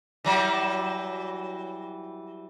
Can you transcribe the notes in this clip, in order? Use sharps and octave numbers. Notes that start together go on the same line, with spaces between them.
E3 F#3 G3